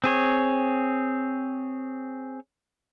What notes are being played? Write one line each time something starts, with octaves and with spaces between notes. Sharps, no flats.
C4 G#4 C#5